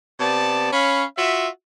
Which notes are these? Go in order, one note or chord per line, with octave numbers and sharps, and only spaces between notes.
C3 B3 D5 A5
C#4 C#5 F5 B5
F4 F#4 E5